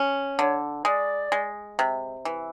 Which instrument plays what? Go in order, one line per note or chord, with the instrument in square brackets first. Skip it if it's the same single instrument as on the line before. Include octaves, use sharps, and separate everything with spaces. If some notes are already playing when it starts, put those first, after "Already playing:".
Already playing: [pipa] C#4
[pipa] D3 [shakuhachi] C#5
[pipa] G#3 [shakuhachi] D5
[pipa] G#3
C3
E3